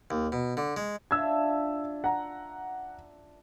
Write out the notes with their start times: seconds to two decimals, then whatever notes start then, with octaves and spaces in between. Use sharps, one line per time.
0.11 D#2
0.32 B2
0.57 D3
0.77 G#3
1.11 D4 F4 E5 E6 G#6
2.04 F#5 A#5